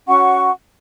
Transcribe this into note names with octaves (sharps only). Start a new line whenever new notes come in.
C#4 F#4 F#5 C#6